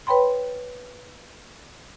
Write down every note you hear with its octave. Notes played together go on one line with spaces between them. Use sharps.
B4 C#5 G5 B5 C6